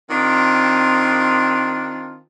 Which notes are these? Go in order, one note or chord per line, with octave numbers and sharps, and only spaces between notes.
D#3 C4 D4 F4